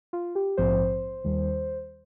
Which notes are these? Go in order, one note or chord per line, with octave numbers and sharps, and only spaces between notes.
F4
G4
A#1 G#2 F3 C4 C5
D#2 D#3 G3